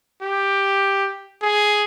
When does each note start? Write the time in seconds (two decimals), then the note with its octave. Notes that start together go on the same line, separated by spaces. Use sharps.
0.22 G4
1.42 G#4